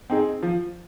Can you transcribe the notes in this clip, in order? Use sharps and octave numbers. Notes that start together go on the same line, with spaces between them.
C4 D#4 G#4
F3